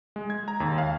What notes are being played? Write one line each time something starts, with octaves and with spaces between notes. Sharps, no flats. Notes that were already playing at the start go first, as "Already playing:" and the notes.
G#3
G#6
A#5
D#2
F5